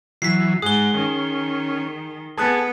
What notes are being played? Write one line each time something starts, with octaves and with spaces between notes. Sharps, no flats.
E3 F#3 B6 C7
G#2 G#4 F#5 D#6 G7
D#3 C#4
B3 G#4 A4 A5 D#6 F#6